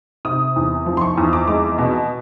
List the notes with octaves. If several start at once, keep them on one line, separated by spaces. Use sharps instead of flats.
C3 D#6
E2
F3
C6
C#6
E2 D#6
D6
G#3 D6
B2